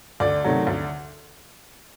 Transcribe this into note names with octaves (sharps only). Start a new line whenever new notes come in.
D2 D5
C3 D#3 F#3 A3
D2